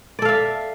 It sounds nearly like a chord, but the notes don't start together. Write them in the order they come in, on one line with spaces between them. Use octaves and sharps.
D5 A4 F5 E5